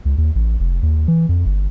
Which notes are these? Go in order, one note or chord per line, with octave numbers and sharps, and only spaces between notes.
C#2
D#2
A1
F1
D#2
E3
F2
G1